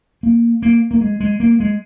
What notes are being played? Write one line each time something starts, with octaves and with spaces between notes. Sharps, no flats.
A#3
A#3
A#3
G#3
G#3
A#3
G#3